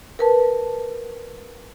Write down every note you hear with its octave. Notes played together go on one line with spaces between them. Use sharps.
A#4 B4 A5